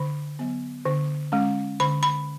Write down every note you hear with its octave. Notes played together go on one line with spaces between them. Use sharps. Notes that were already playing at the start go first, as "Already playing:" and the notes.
Already playing: D3 B5
F#3 B3
D3
G#3 C#4
D3 B5
B5